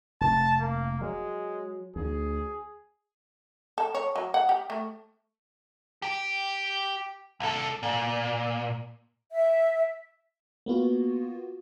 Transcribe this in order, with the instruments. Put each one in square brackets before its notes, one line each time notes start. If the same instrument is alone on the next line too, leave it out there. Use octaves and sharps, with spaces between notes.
[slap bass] F1 [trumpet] A5
[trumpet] A#3
[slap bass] F#3 [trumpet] G#3
[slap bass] D2 [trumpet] G#4
[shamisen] A4
C#5
F#3
F#5
G4
A3
[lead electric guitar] G4 G5
C2 A4
A#2
[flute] E5
[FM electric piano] A#3 B3 F4 F#4